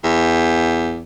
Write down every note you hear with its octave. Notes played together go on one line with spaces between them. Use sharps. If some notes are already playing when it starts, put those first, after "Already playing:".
E2